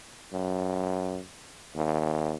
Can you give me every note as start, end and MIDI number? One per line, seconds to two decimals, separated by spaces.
0.33 1.20 42
1.76 2.35 39